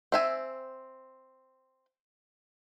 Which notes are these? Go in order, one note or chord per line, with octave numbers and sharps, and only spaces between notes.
C4 E5 G#5